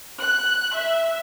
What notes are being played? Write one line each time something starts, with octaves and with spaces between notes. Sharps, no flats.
F#6
E5